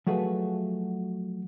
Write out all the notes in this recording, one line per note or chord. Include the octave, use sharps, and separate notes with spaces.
F3 F#3 A3 F#4 G#4 B4